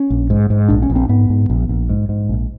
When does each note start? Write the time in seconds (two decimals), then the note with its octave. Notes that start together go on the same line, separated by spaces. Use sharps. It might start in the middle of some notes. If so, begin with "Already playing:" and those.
Already playing: C#4
0.10 A#1
0.30 G#2
0.50 G#2
0.68 A#1 D4
0.82 C#4
0.89 A#1
0.96 C4
1.09 G#2 B3
1.30 G#2
1.50 A#1
1.69 A#1
1.89 G#2
2.09 G#2
2.29 A#1